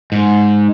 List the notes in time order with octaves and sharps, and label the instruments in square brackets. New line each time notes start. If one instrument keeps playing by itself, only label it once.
[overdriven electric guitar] G#2